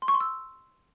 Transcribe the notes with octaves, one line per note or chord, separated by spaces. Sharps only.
C6
C#6
C6
E6